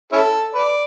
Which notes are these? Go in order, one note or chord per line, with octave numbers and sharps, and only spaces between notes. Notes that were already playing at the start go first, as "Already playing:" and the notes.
C#4 E4 A4
B4 D5